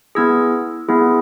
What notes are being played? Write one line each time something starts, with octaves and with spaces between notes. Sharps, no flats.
B3 E4 G#4 E6 G#6
B3 E4 G#4